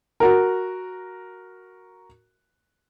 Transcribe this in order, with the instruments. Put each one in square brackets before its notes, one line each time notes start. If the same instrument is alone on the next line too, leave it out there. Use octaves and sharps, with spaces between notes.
[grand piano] F#4 A#4